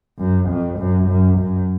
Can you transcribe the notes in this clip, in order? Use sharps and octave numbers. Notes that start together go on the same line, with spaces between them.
F#2
F2
F#2
F#2
F#2